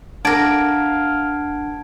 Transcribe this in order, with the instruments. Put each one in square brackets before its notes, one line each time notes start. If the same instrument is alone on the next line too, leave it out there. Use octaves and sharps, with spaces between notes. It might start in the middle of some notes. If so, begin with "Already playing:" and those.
[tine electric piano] D4 F#5 [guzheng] A#4 D5 [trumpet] F5 [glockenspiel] A5 G#6 D7